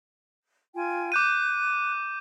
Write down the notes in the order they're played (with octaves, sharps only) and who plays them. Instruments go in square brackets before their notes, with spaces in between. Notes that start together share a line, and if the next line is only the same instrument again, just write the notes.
[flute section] F4 G5 G#5
[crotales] D6 G6 D#7 [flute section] F#6